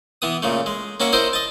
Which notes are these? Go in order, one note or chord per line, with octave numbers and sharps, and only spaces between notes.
E3 B3 D#6
A#2 C#3 A3
G#3
A#3 C#4 F#4 E5 C#6
E4 A#4 C5 D#5
D#5 A5